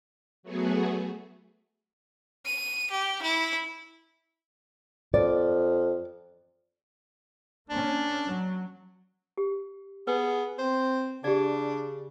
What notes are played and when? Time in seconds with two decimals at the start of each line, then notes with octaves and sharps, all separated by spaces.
0.43 F#3 A3 B3 F#4 G#4
2.45 D#7
2.91 G4
3.23 E4
5.14 F2 D5
7.70 A#3 C#4 D4
8.28 F#3
9.37 G4
10.07 B3 G#4 B4
10.59 C4 C5
11.24 C#3 D4 G4 D5